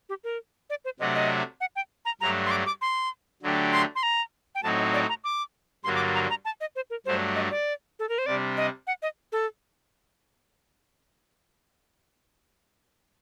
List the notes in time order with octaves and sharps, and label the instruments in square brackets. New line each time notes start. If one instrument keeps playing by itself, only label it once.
[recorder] G4
A#4
D5
C5
[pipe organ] C3 F#3 A3 D4 F#4 [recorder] D#5
[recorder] D#5
F#5
G5
A#5
[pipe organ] G2 F#3 A3 D4 [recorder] A#5
[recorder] C6
D6
D6
C6
[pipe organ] D3 F#3 A3 D4 G4
[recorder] C6
C6
A#5
G5
[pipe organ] A2 F#3 C4 D#4 F#4 [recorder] A5
[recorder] D#5
D5
A#5
D6
[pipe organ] G2 D3 F#3 A#3 D4 [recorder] C6
[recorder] D6
A#5
A#5
A5
D#5
C5
A#4
[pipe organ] G2 F#3 A3 D4 [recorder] C5
[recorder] D#5
D5
A4
A#4
C5
[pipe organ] C3 G3 D4 [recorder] D5
[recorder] D#5
F#5
D#5
A4